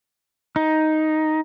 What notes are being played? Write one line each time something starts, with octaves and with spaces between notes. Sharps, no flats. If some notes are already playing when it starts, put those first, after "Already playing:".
D#4